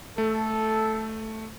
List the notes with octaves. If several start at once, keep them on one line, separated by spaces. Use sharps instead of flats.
A3 A4